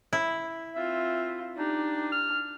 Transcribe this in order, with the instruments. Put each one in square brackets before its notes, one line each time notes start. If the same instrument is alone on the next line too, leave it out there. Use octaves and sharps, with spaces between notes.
[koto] E4
[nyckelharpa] C4 F4 [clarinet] E5
[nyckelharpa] D4 G4 [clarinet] D#4
[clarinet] F6